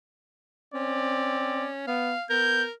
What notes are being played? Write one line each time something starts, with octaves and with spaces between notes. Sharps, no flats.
C4 C#4 D5
B3 F5
B3 A#4 G6